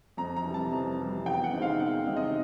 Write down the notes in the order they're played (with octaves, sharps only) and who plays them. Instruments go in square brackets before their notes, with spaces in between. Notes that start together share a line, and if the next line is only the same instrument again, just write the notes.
[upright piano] F2 A#5
A#5
C3 E3 G3
A5
F2
C3 E3 G3
E2 G5
F#5
C3 D#3 G#3 C4
F5
E2 F#5
C3 D#3 G#3 C4
D#5